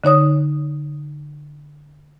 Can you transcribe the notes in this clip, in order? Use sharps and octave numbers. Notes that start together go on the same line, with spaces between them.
D3 D#4 C#5 D#6